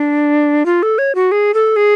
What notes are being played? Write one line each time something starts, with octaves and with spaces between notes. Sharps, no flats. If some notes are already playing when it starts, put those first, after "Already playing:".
Already playing: D4
F4
A4
C#5
F#4
G#4
A4
G#4